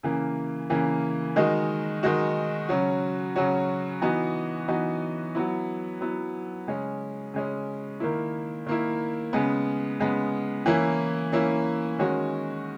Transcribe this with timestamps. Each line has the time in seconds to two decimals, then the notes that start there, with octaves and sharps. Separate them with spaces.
0.03 C#3 E3 A#3
0.70 C#3 E3 A#3
1.36 D#3 G#3 D#4 F#4
2.03 D#3 G#3 D#4 F#4
2.69 C#3 F#3 C#4 F#4
3.36 C#3 F#3 C#4 F#4
4.02 E3 B3 D#4 F#4
4.68 E3 B3 D#4 F#4
5.35 F#3 B3 E4
6.01 F#3 B3 E4
6.67 C#3 G#3 C#4
7.34 C#3 G#3 C#4
8.00 D#3 A#3 E4
8.67 D#3 A#3 E4
9.33 C#3 G#3 B3
9.99 C#3 G#3 B3
10.66 E3 A#3 C#4 E4
11.32 E3 A#3 C#4 E4
11.99 D#3 G#3 C#4 F#4